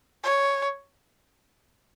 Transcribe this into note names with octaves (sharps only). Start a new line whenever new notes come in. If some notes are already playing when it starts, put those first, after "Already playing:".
C#5